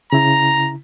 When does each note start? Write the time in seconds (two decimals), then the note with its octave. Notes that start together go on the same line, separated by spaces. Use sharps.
0.13 C#3 E4 A#5